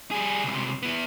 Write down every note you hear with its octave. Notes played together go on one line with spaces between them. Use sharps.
G3 G#4
C#2 C3
B3 E4